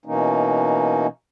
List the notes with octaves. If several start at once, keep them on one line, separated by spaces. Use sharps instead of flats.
B2 E3 A#3 C#4 D#4